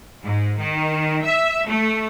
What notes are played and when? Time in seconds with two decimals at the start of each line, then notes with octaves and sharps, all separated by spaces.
0.23 G#2
0.59 D#3
1.24 E5
1.66 A3